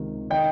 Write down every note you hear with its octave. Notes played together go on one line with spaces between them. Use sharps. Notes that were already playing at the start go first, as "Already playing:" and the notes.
Already playing: C#2 C3 D#3
D#3 D#5 G5